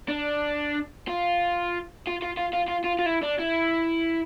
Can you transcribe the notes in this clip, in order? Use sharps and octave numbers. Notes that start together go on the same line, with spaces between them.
D4
F4
F4
F4
F4
F4
F4
F4
F4
E4
D4
E4